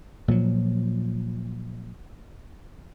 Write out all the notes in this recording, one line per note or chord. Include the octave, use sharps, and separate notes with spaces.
A#2 F3 F#3